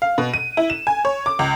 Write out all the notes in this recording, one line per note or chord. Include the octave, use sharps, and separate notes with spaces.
F5
B2
D#7
E4
E7
G#5
C#5
D6
C#2